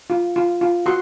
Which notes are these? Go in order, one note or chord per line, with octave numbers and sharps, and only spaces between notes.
F4
F4
F4
F#4 C6